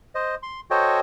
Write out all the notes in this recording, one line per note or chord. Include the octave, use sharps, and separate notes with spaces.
C5 D#5
C6
F#4 A4 C5 C#5 D#5 G5